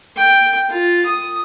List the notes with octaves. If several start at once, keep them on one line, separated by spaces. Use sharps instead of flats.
G5
F4
D#6